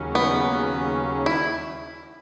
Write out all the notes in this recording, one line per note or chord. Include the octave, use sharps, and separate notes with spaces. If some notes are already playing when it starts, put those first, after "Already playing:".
Already playing: D#2 C#3 F#3 C#4
B3
E4